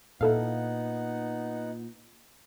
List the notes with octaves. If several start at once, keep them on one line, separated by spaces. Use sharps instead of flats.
A#2 B3 D#4 E4 A4 F5 F#5